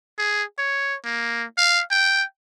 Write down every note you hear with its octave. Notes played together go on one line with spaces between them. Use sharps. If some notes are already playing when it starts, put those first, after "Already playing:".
G#4
C#5
A#3
F5
G5